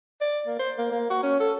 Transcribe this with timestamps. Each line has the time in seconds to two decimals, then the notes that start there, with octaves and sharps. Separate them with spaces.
0.21 D5
0.47 A#3
0.59 C5
0.78 A#3
0.92 A#3
1.10 F#4
1.23 C#4
1.40 A4